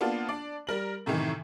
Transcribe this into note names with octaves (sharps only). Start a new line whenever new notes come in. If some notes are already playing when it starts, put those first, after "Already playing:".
A#3 B3 D4 F4
D4 D5
G3 A#4 F#7
F#2 A2 C3 D#3 E3